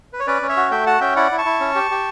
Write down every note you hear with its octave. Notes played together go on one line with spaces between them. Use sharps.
B4
C#5
C#4 B4 D5
C#4
C#5 E5
F#4
A3 E5 G5
F#4 F#5 A5
C#4 E5 G5
E4 D5 F#5
E4
A5 C#6
E4
C#4
G4
G4